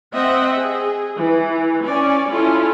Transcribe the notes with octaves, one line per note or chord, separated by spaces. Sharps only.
C4 D#5 E5 F#5
G#4
E3
C#4 D5
C#4 E4 F4 A4